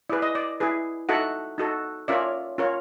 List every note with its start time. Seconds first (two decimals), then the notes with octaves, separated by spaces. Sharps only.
0.10 E4 G#4 B4 D5
0.22 D#5
0.35 D5
0.60 E4 G#4 B4
1.09 D#4 F#4 A4 E5 F#5
1.58 D#4 F#4 A4
2.08 C#4 F4 A#4 C#5 D5 E5
2.58 C#4 F4 A#4 C#5